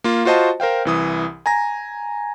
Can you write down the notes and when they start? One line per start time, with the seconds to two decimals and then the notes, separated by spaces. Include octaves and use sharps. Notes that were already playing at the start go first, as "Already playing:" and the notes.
0.04 A#3 F4
0.25 F4 F#4 C5 D#5 A5
0.60 A#4 C5 F5 G5
0.85 C2 E3 D#6
1.46 G#5 A#5 A#6